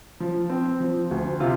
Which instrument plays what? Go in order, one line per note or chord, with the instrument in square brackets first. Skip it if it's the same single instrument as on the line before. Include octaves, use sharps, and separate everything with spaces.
[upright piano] F3
C4
F3
D2
C3 F4